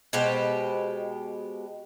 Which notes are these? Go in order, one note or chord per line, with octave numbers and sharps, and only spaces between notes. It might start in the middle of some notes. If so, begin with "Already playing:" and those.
B2 G#3 G4 C5